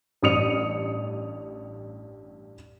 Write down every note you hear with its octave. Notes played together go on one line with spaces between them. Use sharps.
A1 G2 D#6 C#7 F7